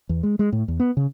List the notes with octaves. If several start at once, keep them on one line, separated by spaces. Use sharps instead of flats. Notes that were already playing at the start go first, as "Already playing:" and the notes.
E2
G#3
G#3
A2
E2
B3
C#3